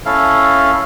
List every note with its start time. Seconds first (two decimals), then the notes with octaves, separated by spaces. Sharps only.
0.06 C#4 E4 A4 F5